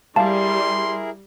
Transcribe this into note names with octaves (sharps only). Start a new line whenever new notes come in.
G3 E4 G#4 A#4 F5 A5 C6